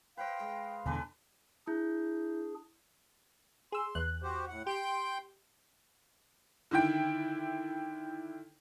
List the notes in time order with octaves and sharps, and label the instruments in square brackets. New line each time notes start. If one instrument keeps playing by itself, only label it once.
[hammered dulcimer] B4 C5 D#5 [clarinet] F5 [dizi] G5
[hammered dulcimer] G#3
[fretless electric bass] E2 B2 D3 [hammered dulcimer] D4 A4 B4 [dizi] G#5
[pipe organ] D4 G#4 [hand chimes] E4 G6
[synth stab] G#4 E6 [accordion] C6
[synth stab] E2 F#6
[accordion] F#4 G4 C5
A2 F#5
[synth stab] G4 [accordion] G5 C6 G6
[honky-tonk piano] D3 D#3 E4 G5